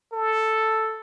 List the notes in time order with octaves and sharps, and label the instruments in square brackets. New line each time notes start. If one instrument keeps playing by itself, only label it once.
[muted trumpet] A4